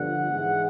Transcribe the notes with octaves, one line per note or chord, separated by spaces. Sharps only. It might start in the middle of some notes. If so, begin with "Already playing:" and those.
Already playing: G1 G2 D3 F3 F#5
G#2 E3 G#3